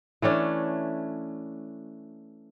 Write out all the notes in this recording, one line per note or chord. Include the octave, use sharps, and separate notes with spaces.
E3 A3 C#4 D4